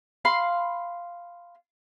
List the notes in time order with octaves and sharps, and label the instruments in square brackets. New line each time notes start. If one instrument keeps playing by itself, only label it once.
[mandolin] F5 B5 C6